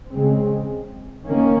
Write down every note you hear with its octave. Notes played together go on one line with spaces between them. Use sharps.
C#3 G#3 C4
D#3 A#3 C#4